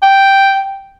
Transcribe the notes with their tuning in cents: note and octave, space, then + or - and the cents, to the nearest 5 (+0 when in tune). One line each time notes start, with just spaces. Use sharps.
G5 -5